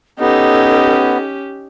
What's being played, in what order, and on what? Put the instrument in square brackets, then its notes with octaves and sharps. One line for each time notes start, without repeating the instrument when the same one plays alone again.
[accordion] B3 [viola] C#4 G4 [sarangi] D#4 [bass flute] A4